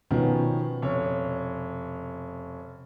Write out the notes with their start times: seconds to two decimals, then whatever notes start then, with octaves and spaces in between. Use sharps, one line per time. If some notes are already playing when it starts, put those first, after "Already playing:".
0.11 B2 D#3 F3 B3 C#4
0.82 F1 C#5